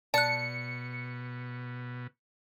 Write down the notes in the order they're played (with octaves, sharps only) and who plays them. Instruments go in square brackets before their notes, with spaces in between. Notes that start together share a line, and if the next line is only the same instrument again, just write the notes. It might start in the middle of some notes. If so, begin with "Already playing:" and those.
[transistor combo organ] B2 [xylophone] D5 F#6 [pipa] A5 [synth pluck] C#7